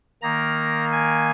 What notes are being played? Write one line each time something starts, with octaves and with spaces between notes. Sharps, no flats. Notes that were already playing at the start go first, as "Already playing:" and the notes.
D#3 A#3 A#5
G#5